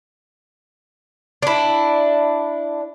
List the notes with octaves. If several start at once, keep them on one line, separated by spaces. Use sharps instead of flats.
D4 E4